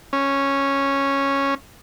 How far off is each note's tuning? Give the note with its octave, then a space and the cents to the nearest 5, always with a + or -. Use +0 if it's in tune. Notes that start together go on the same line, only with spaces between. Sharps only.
C#4 -5